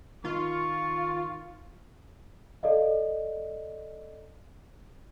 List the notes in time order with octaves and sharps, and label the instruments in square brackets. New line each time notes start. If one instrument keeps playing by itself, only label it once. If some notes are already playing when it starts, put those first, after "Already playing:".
[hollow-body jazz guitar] D#3 [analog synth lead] F4 [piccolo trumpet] C#6
[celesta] A4 D5 D#5 F5